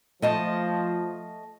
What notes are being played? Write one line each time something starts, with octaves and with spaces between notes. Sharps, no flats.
F3 A3 D#5 A5